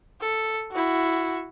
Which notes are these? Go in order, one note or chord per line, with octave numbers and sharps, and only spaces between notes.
A4
E4 F#4